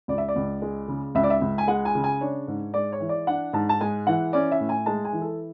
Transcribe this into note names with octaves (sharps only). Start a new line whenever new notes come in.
C#2 D5
E5
D5
C#2
G#3
C#3
C#2 E5
D5
E5
C#2
G#5
G#3 F#5
G#5
C#3
G#5
D4 C#5
G#2
G#3 D5
C#5
E3
D5
D4 F#5
G#2 A5
A5
G#3 G#5
E3 F#5
C#4 D5
E5
A2
G#5
G#3 A5
G#5
E3
A4